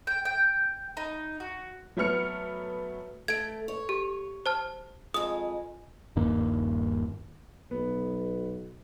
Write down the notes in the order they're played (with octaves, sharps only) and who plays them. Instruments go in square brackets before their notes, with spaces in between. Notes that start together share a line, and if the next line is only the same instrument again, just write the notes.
[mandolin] G5
G5
D#4
F#4
[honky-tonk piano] F#3 A3 B3 F6 C#7
[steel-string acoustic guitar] A3 [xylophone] G#6 D7
[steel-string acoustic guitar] C#5
[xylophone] G4
C5 A5 F6
[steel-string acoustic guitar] F2 G#3 [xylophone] D#6
[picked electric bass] D#1 G2 D#3 A#3
[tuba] B1 [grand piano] B3